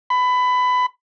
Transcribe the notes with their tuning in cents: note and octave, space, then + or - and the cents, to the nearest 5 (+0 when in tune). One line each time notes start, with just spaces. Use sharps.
B5 +20